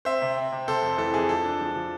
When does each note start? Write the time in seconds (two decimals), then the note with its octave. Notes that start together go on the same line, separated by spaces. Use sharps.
0.05 C4 C5 E5
0.22 C3
0.37 C4
0.52 C3
0.68 C3 A4 C5
0.82 F2
0.98 E3 A4
1.14 F2 G#4
1.29 F3 A4
1.44 D4
1.61 F3
1.76 F3